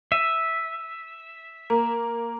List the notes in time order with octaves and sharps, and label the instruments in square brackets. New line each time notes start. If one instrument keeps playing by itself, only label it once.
[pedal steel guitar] E5 [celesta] D#7
[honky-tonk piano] A#3 [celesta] A#5